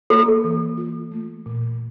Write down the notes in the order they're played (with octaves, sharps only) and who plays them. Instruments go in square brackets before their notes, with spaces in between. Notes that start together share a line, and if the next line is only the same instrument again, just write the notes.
[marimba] A#3 [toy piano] A4
[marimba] E3
F4
A3
A#2